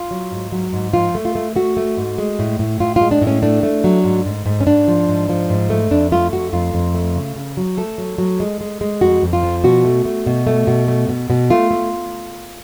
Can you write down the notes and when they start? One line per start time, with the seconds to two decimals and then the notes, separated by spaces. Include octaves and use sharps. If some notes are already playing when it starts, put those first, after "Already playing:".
Already playing: F4
0.11 F#3
0.31 G#2
0.52 F#3
0.73 G#2
0.93 F3 F4
1.15 A3
1.25 F4
1.35 A3
1.56 A3 F#4
1.77 A3
1.97 G#2
2.18 G#3
2.39 A2
2.59 A2
2.80 A2 F4
2.96 F4
3.01 G#3
3.11 D4
3.22 A2
3.27 C#4
3.42 A3 D4
3.63 A3
3.84 F#3
4.04 G#2
4.25 G#2
4.46 G#2
4.61 C#4
4.67 G#2 D4
4.88 F3
5.08 G#2
5.29 F3
5.50 G#2
5.70 A3
5.91 F2 D4
6.12 A3 F4
6.32 F2 F#4
6.53 F2 F4
6.74 F2
6.95 A3
7.15 C#3
7.36 C#3
7.57 F#3
7.77 A3 A4
7.98 F#3
8.18 F#3
8.40 G#3
8.61 G#3
8.81 G#3
9.01 F2 F#4
9.22 F2
9.33 F4
9.43 F3
9.64 B2 F#4
9.85 A3
10.05 A3
10.26 B2
10.47 A3
10.67 B2
10.88 A3
11.09 B2
11.30 B2
11.50 A3 F4
11.71 A3